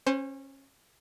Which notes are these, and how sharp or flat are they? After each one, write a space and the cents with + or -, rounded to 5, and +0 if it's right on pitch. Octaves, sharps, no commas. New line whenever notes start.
C#4 -25 C5 +0